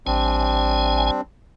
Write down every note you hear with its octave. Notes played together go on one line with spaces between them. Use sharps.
A1 G3 C4 D4 G#5